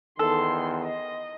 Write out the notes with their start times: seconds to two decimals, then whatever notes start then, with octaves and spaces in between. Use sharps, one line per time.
0.19 E2 D#3 A4 C6
0.83 D#5